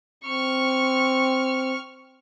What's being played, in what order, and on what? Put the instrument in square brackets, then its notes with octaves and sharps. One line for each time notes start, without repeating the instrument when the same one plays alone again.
[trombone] C4 [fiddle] C#6 F6